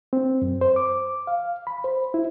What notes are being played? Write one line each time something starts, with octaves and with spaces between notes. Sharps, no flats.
C4
F#2
C5
D6
F5
B5
C5
E4